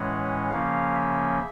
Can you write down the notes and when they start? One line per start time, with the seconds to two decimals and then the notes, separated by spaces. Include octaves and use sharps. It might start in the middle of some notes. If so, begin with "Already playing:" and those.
Already playing: A2 E3 G#3 C#4 F#5
0.50 C#3 F3 A#3 C#4 F5
0.95 E5